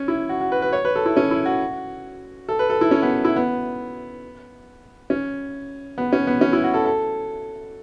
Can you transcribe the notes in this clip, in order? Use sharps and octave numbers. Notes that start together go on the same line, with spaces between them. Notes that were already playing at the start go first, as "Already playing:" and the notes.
Already playing: C#4
E4
F#4
F#4
B4
B4
C#5
B4
A4
E4
C#4
E4
F#4
A4
B4
A4
E4
C#4
B3
E4
B3
C#4
B3
C#4
B3
C#4
E4
F#4
A4
A4